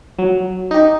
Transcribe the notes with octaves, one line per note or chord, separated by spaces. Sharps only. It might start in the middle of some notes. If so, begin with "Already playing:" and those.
F#3
D#4 G4